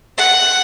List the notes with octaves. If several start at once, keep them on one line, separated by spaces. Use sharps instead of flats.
F#5